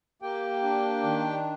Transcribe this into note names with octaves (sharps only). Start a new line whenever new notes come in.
A#3 G4 G5
D4
D#3